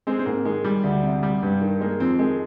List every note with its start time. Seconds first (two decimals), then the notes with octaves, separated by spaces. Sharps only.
0.07 G#3 C4
0.19 C4
0.26 G#2 A#3
0.45 D#3 G#3
0.64 G3
0.84 D2
1.03 C3
1.23 G3
1.43 G2
1.61 D#3
1.80 G#3 A#3
2.00 F2 C4
2.19 D#3 G#3